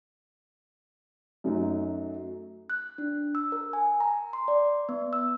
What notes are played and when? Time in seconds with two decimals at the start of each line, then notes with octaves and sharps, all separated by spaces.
1.44 F#2 F#3 A3 D#4
2.70 F#6
2.98 D4
3.35 E6
3.52 A#4
3.73 G#5
4.00 A#5
4.33 C6
4.48 D5
4.89 B3
5.13 E6